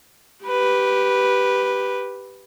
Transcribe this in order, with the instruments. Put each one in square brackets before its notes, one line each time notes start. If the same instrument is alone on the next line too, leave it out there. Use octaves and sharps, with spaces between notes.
[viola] G4 B4